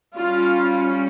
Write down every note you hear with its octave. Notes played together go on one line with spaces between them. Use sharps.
G3 C#4 F4